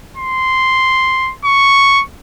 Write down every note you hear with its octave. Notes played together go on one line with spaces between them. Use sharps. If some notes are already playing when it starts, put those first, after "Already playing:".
C6
C#6